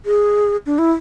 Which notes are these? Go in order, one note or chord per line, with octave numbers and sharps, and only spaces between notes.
G#4
D4
E4